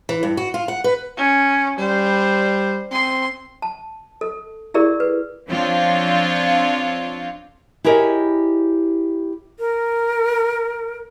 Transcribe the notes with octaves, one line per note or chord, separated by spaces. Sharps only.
E3
G2
F#4
F4
F#5
B4
C#4
G3 C5
C4 C6
A5
A4
E4 G4 G#4 A#4 D5
B4
F3 C4 D4 F4 C#5
E4 G4 G#4 A#4 C#5 D#5
A#4